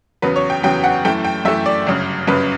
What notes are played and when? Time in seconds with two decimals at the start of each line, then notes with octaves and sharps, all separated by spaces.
0.22 E2 C#3 F#3 B3 B4
0.36 C#5
0.50 G5
0.63 E2 C#3 F#3 B3 G5
0.84 F#5
1.05 F#2 E3 A3 G5
1.25 G5
1.45 F#2 E3 A3 E5
1.66 D5
1.87 G1 F#2 C#3
2.27 G1 F#2 C#3 B4